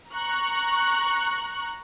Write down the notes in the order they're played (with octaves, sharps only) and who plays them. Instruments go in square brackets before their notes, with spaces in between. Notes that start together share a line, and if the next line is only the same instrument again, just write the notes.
[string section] A#5 C#6 F#6